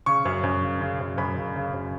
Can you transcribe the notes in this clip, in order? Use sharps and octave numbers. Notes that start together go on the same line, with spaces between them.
C#3 C#6
F#2
F#2
C#3
C#3
F#2
F#2 B5
C#3
C#3
F#2